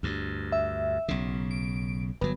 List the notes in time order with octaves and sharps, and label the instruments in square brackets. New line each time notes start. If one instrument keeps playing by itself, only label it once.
[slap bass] D2 G2
[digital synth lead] E5
[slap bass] B1 C#3
[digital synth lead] D7
[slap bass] G1 F#3 [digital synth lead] B3